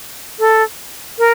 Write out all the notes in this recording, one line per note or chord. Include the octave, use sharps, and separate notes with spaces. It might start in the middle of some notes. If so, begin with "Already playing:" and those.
A4
A#4